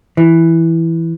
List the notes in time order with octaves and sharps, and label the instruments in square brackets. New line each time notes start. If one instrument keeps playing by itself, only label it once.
[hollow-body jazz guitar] E3